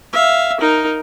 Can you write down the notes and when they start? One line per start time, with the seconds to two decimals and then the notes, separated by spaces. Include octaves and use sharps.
0.13 E5 F5
0.60 D#4 A#4